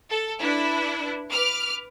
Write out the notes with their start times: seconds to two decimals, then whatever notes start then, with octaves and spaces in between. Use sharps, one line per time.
0.10 A4
0.41 D4 E4 B4
1.31 B4 D6 F6